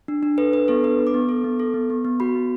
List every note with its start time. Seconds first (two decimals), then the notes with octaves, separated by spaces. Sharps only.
0.08 D4
0.23 D4
0.38 A4 B4
0.53 D4 B4
0.68 B3 A4
0.83 D4 B4
0.99 B3
1.07 D6
1.14 B3
1.29 A4
1.44 B3
1.60 A4
1.74 B3
1.90 B3
2.05 B3
2.20 F#4 B5
2.35 B3